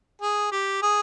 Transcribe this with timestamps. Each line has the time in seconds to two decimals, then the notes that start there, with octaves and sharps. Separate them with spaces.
0.22 G#4
0.52 G4
0.82 G#4